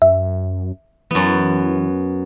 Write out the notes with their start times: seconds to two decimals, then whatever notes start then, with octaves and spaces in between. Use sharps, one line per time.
0.02 F#2 E5
1.11 F#2 E3 B3